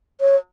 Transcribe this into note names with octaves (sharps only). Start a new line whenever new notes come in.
C#5